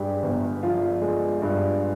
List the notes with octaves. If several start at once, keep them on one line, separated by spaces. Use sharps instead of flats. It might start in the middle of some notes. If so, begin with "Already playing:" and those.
Already playing: G2 G#3 G4 G#4
G1
F3 F4
G#3
G2